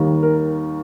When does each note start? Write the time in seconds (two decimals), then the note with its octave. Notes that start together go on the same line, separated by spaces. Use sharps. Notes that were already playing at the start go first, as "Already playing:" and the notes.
Already playing: D#2 D#3 G3
0.23 A#4